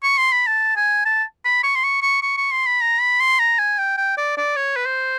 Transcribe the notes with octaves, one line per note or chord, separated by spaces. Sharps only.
C#6
C6
B5
A5
G#5
A5
B5
C#6
C6
C#6
C#6
C#6
C#6
C6
B5
A#5
B5
C6
A#5
G#5
G5
G5
D5
D5
C#5
B4
C5